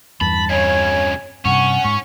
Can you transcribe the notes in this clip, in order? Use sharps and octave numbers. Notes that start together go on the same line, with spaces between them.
E2 G2 A5 B5
F2 C#3 C#5 G#5
G2 C3 C#4 F#5 C#6
G#2 C#6